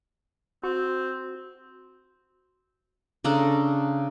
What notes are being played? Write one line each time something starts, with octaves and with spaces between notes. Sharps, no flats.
C4 F#4
C#3 D4 A4 A#5